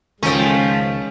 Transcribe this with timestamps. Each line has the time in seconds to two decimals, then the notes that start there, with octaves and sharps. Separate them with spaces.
0.23 C#2 D#3 F3 G#3 A3 C#4 G5 A#5